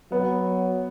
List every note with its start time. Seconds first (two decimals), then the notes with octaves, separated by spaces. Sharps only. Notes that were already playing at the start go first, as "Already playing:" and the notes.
0.12 F#3 B3